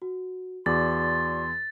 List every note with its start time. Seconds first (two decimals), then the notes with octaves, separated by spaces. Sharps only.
0.02 F#4
0.66 E2 F#4 D5 C6 D6 A6